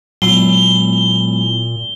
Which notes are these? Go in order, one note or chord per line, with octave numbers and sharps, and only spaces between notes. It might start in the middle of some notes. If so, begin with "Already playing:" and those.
A#2 F#3 G#3 B3 E4 G7